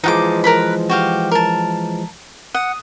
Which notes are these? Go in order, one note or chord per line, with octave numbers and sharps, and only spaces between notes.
E3 F3 G#3 D#4 F#5 D6
A#4 B4 B5
F#4 G4 F5
A#4 A5
F#5 D#6